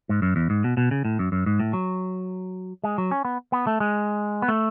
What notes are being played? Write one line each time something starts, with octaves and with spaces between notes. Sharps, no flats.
G#2
F#2
E2
G#2
B2
B2
C#3
A2
F#2
F#2
G#2
A2
F#3
G#3
F#3
C#4
B3
B3
A3
G#3
B3
A3